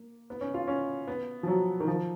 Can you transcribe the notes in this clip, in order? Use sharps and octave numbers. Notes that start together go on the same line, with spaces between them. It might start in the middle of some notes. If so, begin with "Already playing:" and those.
Already playing: A#3
B3
C#4
F4
C#4
B3
F3
F#3
D#3
F3